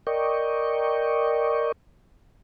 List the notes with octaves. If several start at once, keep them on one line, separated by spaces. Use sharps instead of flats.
A#4 D5 D#5 G5 C#6